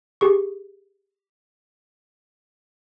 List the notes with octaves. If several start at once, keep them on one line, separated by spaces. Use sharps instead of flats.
G4 G#4 C#6